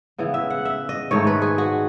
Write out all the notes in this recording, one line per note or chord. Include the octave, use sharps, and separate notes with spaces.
C#3 E3 B3
E5
F#5
E5
D#5
G#2 D#3 A3 C#5
B4
G#4
F#4